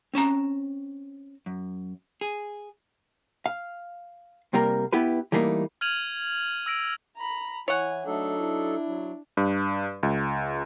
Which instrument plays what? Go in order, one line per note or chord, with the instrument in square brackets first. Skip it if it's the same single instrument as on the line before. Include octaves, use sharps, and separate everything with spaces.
[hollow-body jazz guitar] C4 C#4 A5 A#5
F#2
G#4
F5
C2 C3 G3 A#3 A#4
B3 E4 G4 B4
E3 G3 A3 A#3 D4 D#4
[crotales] F6 G#6 D#7 F7 F#7
E6 A#6 D7
[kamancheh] A#5 B5
[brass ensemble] E3 E4 [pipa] C#5 F#5 [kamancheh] G#5
[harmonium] F#3 D#4 A4 [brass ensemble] A3 E5 [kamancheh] D4
[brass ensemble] E4
[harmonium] F#3
[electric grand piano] G2
C#2